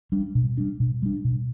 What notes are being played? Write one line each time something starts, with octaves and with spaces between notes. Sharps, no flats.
G3 D4
B2
G3 D4
B2
G3 D4
B2